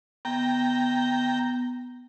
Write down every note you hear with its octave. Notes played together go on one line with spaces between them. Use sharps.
B3 G5 A#5